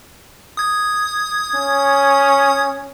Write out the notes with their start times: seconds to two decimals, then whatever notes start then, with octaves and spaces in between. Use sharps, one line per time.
0.57 D#6 G#6
1.55 C#4